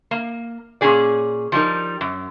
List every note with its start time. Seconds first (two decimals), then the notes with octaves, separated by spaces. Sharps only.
0.11 A#3
0.81 A#2 D#3 C#4 G#4 D5
1.52 F3 G3 D#4 A#4
2.01 F#2